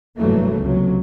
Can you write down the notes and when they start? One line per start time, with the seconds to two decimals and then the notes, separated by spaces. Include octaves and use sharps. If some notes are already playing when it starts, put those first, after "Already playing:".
0.16 F1 G2 E3 F#3 A3 A#3
0.61 C#2 C3 F#3